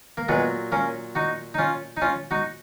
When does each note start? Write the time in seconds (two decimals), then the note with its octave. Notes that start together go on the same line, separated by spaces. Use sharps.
0.17 A#3
0.29 A#2 F#3 G#3 B3
0.72 A#3 C#4
1.15 D#4 F#4
1.54 D#4
1.58 C#4 F4
1.97 D#4
2.01 C#4 F4
2.31 D#4 F#4